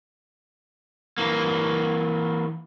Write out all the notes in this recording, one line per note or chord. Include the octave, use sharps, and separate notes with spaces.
E3 A#3